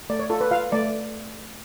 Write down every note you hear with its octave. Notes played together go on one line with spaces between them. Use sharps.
A3 D5
C#5
F4 A4
B4
F4 F5
A3 D5